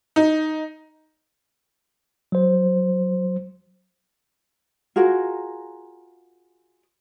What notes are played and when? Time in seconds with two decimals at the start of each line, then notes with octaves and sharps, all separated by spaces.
0.16 D#4
2.32 F#3 C5
4.96 F4 F#4 G#4 A#4